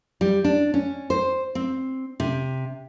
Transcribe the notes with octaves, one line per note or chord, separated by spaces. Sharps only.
G3
D4
C#4
C5
C4
C3